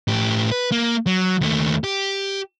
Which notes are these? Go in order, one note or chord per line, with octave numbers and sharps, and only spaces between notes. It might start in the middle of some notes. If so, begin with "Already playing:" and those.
A2 G4
B4
A#3
F#3
D#2 A3
G4